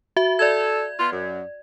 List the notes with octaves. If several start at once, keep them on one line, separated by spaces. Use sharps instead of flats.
F#4 E5
A4 D5 G#6
B3 F4
F#2